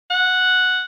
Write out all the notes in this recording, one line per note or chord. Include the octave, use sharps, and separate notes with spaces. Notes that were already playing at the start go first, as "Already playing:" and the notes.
F#5